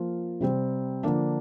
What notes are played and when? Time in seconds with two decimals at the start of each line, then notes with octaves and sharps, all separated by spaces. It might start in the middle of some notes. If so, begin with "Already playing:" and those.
Already playing: F3 A#3 F4
0.41 C3 G3 C4
1.03 D3 F3 A#3 D4